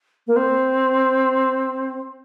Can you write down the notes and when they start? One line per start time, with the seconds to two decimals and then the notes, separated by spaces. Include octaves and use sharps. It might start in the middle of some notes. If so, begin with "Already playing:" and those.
0.27 A#3
0.36 C4